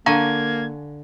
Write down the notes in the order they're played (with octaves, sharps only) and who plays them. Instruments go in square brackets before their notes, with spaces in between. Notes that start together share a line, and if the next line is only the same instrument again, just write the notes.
[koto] D3 G#5 [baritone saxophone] A#3 [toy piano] F5 A#5 C#6 [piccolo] G#6